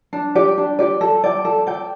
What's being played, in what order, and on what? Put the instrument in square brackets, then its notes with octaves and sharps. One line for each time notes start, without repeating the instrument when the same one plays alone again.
[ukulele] D4
G4 D5
D4
G4 D5
A4
D5 G5
A4
D5 G5